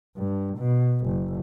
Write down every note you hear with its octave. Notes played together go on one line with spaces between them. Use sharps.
G2
B2
F#1